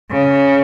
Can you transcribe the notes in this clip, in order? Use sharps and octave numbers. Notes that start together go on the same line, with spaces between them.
C#3